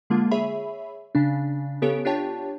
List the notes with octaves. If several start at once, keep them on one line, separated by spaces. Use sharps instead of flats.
D3 G#3 A#3 F4
G#4 C#5 E5 B5
C#3 D4
C#3 B3 G4 A4 C#5 D7
D4 F4 G4 C#5 G5 A5